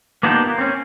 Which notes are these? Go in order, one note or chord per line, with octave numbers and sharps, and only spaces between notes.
A#3 B3 D4 D#4 F4 G4
A#3
C4 C#4